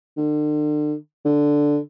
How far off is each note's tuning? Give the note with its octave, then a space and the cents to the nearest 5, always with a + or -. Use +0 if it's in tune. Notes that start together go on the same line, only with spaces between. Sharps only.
D3 +40
D3 +0